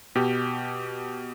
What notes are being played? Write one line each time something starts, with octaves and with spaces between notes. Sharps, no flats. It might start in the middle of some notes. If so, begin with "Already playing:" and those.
B2 G4